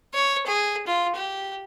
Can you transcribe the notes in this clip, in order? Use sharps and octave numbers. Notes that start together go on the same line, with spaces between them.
C#5
G#4
F4
G4